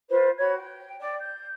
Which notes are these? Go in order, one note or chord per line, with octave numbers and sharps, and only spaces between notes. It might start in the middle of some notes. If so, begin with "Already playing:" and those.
F4 B4 C5
F#4 C#5 B5 G#6
G5
D5 G5
G6